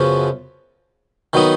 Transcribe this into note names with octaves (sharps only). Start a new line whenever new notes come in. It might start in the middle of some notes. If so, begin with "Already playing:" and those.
Already playing: F#2 C#3 F3 B3 F#4
D#3 F#3 B3 D#4